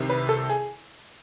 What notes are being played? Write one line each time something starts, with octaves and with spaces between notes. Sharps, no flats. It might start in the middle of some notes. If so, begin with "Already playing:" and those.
Already playing: C2 C3 D#3
B4
A4
G#4